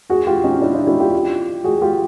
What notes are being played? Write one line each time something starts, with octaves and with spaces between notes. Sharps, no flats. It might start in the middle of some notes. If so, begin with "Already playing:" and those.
F#4 G#4
F4 G4
C#4 D#4
D4 E4
D#4 F4
E4 F#4
F4 G4
F#4 G#4
F4 G4